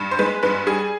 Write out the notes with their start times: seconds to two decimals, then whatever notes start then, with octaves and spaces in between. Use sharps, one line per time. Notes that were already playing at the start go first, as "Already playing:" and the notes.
Already playing: G2
0.11 C5
0.19 G#3 B4
0.43 G2 B4
0.67 G3 G#4